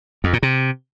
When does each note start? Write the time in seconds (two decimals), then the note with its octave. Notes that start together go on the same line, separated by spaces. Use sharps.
0.24 F2
0.33 A#2
0.43 C3